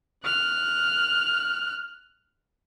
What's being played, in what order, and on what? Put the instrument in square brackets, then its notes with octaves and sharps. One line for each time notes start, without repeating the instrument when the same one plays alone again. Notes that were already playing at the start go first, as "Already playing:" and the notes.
[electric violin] F6 F#6